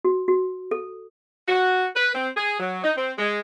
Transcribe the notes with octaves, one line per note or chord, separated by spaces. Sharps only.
F#4
F#4
A4
F#4
B4
C4
G#4
F#3
D#4
C4
G#3